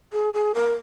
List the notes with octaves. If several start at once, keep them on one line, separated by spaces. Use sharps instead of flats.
G#4
G#4
A#4